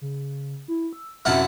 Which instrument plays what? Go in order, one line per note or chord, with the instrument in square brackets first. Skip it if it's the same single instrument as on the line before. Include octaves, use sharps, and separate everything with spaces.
[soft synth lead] C#3
E4
E6
[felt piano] F#2 C3 F6 [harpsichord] E4 F#5 A5